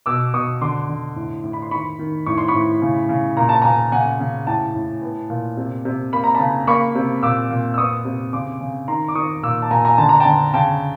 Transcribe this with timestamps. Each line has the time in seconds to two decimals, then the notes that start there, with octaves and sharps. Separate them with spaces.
0.06 B2 D6 E6
0.34 B2 C#6 D#6
0.61 D3 C6 D6
0.89 D3
1.16 A2
1.44 A2
1.53 B5
1.62 C6
1.71 D#3 B5 C#6
1.99 D#3
2.26 A2 C#6
2.38 C6
2.48 B5 C#6
2.54 A2
2.82 C#3
3.09 C#3
3.37 A#2 A#5
3.49 A5
3.62 A#2 G#5 A#5
3.92 C#3 F#5 G#5
4.20 C#3
4.47 A2 G5 A5
4.75 A2
5.02 B3
5.30 A#2
5.57 C3
5.85 C3
6.13 A#3 B5
6.24 A#5
6.35 C#3 A5 B5
6.67 A#3 B5 C#6
6.95 C3
7.23 A#2 D6 E6
7.50 A#2
7.74 E6
7.77 B3 C#6 D#6
8.05 C3
8.33 C#3 C6 D6
8.61 C#3
8.88 D#3 A#5 C6
9.08 D6
9.15 D#3 C#6 D#6
9.43 A#2 D6 E6
9.62 A5
9.71 A#2 G#5 A#5
9.85 G#5 A#5
9.98 D3 A5
10.09 A#5
10.20 G5 A5
10.26 D3
10.54 C#3 G5 A5